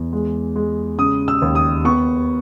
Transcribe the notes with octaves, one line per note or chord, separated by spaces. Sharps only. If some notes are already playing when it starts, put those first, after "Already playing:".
Already playing: E2
G#3
G#3
C#3 D#6
E6
D#2
D#6
B3 C#6